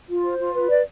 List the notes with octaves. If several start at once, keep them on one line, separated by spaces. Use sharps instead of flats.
F4
C5
F4
B4
D5